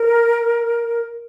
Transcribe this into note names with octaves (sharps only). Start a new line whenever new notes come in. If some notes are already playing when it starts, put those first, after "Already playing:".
Already playing: A#4